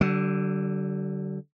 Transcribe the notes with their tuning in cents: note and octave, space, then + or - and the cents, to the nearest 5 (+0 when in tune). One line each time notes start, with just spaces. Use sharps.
D3 +0 G3 -45